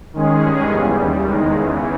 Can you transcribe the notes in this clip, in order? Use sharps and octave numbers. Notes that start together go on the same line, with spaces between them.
D#3 G#3 C#4 G#4
G2 D#3 G#3 C#4 G#4
E2 C#3 E3 G3
D#2 C#3 G3
E2 D#3 G#3
E2 C#3 E3